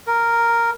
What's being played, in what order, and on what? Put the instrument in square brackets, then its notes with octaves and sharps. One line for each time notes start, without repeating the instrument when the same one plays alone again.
[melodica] A#4